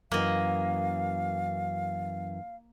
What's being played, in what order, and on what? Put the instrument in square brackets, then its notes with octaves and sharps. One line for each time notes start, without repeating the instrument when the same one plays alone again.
[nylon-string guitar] F#2 E3 [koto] A#3 D#5 [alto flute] F5